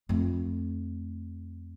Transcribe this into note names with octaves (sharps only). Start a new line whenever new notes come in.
F2 A3